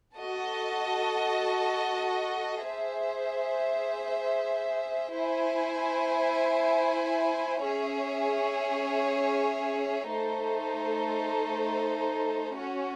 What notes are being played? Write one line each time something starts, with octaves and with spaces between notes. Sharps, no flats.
F#4 A4 D#5 A5
G#4 C5 E5
E4 C5 E5 G#5
C#4 G#4 C#5 E5
A3 D#4 A4 C5
C#4 F#4 C#5